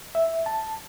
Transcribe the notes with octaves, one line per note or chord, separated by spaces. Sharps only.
E5
A5